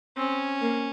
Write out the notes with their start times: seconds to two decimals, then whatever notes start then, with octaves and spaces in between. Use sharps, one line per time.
0.17 C4 C#4
0.61 A#3